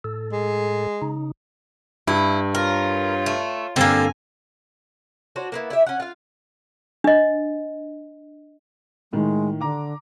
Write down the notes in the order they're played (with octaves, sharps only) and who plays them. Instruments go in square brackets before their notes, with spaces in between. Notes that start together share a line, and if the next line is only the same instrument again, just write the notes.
[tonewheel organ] A2 A4
[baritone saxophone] G#3
[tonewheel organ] C#3 D#4
[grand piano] G2 [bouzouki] E4
[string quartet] F4 C#5 [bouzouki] A#4
[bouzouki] A3
[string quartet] G2 G#5 [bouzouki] D3 A#3 [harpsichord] C4 A4
[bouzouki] D4 F#4 C5 C#5
A#3 B3 E4
E4 G4 E5
C#4 F#5
F4 F5
[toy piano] D4 D#5
[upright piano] A2 D#3 [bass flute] G#3
[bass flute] D3 [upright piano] A#5 D6